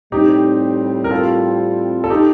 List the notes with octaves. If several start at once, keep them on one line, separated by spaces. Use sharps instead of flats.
A2 G3 C4 D#4 G4
A#4
F4 A4
A4
D#4 G4